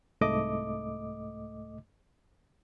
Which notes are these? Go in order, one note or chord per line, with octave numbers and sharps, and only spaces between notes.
C2 G#2 A3 D#5 D6